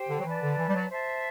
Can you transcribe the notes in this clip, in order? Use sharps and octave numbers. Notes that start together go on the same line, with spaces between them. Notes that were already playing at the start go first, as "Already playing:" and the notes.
Already playing: G4 C5 G5
D3
F#3
E3 B4 D5 A5
D3
E3
G3
F#3
C5 E5 A5